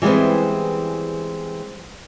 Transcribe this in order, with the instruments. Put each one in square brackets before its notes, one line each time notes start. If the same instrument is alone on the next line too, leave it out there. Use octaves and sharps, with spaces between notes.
[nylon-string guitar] E3 G3 G#3 B3 C4